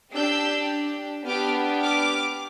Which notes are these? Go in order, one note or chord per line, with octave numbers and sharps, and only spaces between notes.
D4 G4 E6 G6
B3 D4 G4 D6 F6
D6 F6